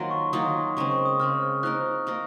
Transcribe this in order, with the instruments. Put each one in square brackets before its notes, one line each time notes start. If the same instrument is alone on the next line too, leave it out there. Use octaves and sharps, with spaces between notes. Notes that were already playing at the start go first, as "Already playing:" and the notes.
Already playing: [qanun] D#3 F#3 A#3 F4
[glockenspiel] C#6
[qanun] D#3 F#3 A#3 F4 [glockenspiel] D#6
[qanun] C#3 G#3 C4 [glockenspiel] C#6
[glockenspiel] C#6
D#6
[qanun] C#3 G#3 C4 [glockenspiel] F6
[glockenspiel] F6
[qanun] F3 A#3 D#4 A#4 [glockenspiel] F#6
[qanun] F3 A#3 D#4 A#4